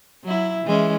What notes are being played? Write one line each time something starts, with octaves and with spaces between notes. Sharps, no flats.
F#3 E4
E3 G#3 C#4